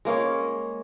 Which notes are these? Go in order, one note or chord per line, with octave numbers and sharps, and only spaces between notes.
G#3 A#3 C#4 C#5